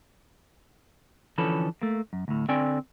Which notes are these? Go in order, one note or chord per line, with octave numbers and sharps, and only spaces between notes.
D3 E3 F3 C#4 A4 B4
A3 A#3
F#2
D2 A2
D3 C4 D5 G5 G#5